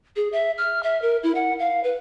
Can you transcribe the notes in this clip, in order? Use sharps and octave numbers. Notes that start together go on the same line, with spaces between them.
G#4
E5
F6
E5
A#4
E4
F#5
F5
B4